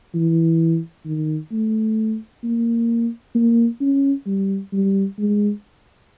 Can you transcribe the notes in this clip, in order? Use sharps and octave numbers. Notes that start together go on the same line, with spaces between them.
E3
D#3
A3
A#3
A#3
C#4
G3
G3
G#3